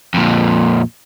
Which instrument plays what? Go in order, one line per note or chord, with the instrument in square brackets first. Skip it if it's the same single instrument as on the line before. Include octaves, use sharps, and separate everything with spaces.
[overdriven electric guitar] F2 A#2